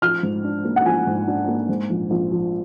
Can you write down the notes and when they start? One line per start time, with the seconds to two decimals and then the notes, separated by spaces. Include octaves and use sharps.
0.02 F3 F6
0.23 G#2
0.44 D4
0.65 A#3
0.76 F#5
0.85 F3 G#5
1.07 G#2
1.28 D4
1.48 A#3
1.69 G#2
1.90 A#1
2.10 A#1
2.31 F3